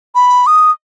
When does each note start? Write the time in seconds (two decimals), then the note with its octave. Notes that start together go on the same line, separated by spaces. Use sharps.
0.15 B5
0.47 D#6